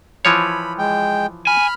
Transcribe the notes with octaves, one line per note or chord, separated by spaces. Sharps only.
E3 F3 C#5 B5
G#3 G5
G#5 B5 F6